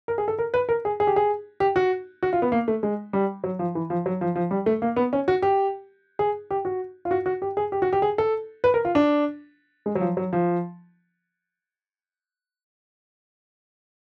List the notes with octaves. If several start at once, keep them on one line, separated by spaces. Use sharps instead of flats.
A#4
G#4
A4
A#4
B4
A#4
G#4
G#4
G4
G#4
G4
F#4
F#4
F4
B3
A#3
A3
G#3
G3
F#3
F3
E3
F3
F#3
F3
F3
G3
A3
A#3
B3
C#4
F#4
G4
G#4
G4
F#4
F4
F#4
F#4
G4
G#4
G4
F#4
G4
G#4
A4
B4
A#4
F4
D4
G#3
F#3
F3
F#3
F3